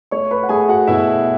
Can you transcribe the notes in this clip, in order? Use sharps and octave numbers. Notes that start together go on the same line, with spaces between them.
A3 C#5 C#6
B4 B5
F#5
A3 G#4 G#5
F#4 F#5
B2 E4 E5